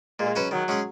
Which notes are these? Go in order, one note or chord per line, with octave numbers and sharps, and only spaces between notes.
A#2 G#3
F#3 C#4 F#4 B4
D#3 F#3
G#3 C#4 G#4